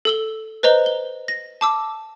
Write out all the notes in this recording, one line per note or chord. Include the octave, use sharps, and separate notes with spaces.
A4 E6 G7
B4 C5 D#5 A#5 G7
G7
A#6
A5 D6 E6